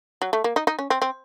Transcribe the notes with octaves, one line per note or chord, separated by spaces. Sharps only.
F#3
A3
A#3
D#4
D#4
C#4
C4
C4